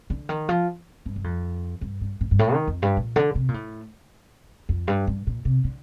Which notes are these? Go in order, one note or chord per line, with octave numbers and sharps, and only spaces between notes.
D3
D#3
F3
G2
G2
F2
G2
G2
A2
G2
A2
D#3
F2
G2
A#2
D3
C3
A#2
A2
F2
G2
G2
A#2
C3
D3